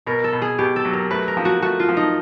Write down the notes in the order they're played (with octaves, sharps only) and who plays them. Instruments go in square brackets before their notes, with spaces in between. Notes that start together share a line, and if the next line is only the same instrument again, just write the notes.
[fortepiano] B2 [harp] A#4
[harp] A4
[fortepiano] B2
[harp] G#4
[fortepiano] B2 [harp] G4
[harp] A4
[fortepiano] F#3
[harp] A#4
[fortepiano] A3 [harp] B4
[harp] A#4
[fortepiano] F3
[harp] F#4
[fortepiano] A3 [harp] F#4
[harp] F4
[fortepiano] F3
[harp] D#4